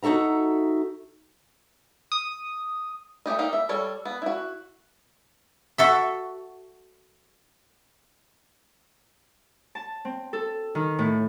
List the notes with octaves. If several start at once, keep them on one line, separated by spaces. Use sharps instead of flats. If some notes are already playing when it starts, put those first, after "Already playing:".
D#4 F#4 A4 E5 A#5
D#6
A3 C#4 G4 D#5
A#3 D#4 G4 G5
E5
G3 A4 C#5
B3
E4 F#4
F#4 A4 E5
A5
C4
A4
D#3
A2